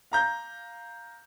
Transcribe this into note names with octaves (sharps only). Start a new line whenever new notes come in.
F5 A#5 G6